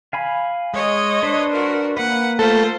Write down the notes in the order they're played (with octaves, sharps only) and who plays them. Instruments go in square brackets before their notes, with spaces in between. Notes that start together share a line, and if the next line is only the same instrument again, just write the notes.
[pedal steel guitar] F5 G#5 B5
[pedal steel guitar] G#3 [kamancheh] C#5 D#5
[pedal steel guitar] D4 B4 C5
[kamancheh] F#4 A#4
[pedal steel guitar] A#3 B4 [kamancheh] F#5
[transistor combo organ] A3 A4 [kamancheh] F4 C5